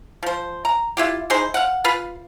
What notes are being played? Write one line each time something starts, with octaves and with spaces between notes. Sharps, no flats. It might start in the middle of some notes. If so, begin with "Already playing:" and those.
F3 C5
A#5
E4 F4 G4
E3 D#4 G#4 C5
F5 F#5
F4 B4 F5